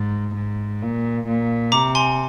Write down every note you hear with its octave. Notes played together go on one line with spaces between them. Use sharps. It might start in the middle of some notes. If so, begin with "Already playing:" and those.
Already playing: G#2
G#2
A#2
A#2
C3 A#5 D6
G#5 C6